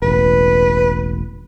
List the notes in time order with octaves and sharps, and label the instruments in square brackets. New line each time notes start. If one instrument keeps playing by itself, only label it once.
[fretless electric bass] E1 A1 [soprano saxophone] B4